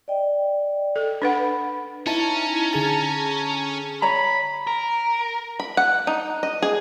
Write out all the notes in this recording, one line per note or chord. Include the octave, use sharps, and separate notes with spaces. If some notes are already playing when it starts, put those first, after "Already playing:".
D5 D#5 G5
A4
D4 B4 F#5 B5
C#4 D#4 E4 A5 A#5
D3 G#4 A5
C#5 A#5 B5
A#4
B5
F#5
D#4
D#5
G#4